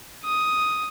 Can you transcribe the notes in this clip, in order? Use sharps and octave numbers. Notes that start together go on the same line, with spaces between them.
D#6